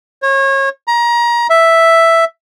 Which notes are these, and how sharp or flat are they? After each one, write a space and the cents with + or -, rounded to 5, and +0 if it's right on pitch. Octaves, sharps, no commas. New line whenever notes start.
C#5 -30
A#5 +25
E5 +0